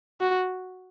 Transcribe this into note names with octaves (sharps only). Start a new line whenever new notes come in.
F#4